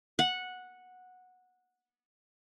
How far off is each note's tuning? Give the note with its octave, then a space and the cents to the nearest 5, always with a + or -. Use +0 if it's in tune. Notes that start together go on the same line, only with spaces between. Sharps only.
F#5 -10